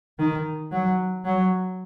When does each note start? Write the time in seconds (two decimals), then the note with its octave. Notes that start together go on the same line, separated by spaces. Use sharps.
0.19 D#3
0.72 F#3
1.25 F#3